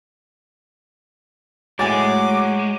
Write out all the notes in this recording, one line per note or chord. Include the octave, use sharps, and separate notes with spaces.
A2 F#3 G#3 G#5 D6 A6